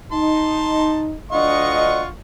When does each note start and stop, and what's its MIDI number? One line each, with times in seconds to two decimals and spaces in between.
0.12 1.14 63
0.12 1.05 81
0.12 1.05 84
1.32 2.02 38
1.32 2.02 62
1.32 2.09 65
1.32 2.02 75
1.32 2.09 78
1.32 2.09 85